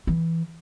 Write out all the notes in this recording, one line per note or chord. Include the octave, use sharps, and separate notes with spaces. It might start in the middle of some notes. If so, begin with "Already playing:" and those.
E3